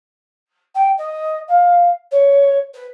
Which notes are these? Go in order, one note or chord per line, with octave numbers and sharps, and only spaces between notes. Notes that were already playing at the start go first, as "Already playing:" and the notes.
G5
D#5
F5
C#5
B4